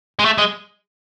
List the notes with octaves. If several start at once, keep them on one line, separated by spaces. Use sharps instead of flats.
G#3
A3
G#3